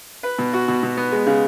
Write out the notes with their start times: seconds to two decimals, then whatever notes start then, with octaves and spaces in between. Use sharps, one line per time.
0.23 B4
0.38 B2
0.53 F#4
0.68 B2
0.83 B2
0.97 B3
1.12 G#3
1.26 C#3